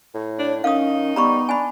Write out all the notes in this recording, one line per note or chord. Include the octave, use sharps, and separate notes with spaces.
A2
D4 C#5
D#3 C#4 D#4 F5 D#6
G3 B3 A#5 B5 C#6
D4 G#5 B5